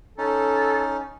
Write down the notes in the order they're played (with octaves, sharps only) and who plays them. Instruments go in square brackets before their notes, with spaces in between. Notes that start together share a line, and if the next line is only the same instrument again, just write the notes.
[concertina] C#4 D#4 [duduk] A4